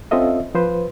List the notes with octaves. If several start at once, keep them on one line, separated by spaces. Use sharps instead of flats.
C4 C#4 F4 A4 D#5 E5
F3 B4 C5